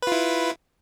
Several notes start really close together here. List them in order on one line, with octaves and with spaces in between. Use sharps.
B4 F4 E4